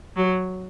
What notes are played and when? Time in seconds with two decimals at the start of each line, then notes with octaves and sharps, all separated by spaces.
0.16 F#3